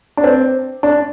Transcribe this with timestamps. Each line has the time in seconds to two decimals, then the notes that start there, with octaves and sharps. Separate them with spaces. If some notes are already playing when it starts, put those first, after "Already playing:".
0.17 D4
0.24 C4
0.83 D4